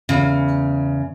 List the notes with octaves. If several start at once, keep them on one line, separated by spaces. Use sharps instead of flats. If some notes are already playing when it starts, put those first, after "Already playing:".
E2 C#3